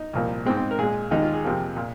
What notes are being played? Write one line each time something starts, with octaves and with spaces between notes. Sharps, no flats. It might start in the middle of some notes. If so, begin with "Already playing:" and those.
Already playing: D#4
C2 A#2 F3 A#3
G#2 G#3 C4
C4
A#4
A#2 G#3 G#4
D#2 D#3 G#3 D#4
F4
G#4
F2 C3 F3 A#3
A#2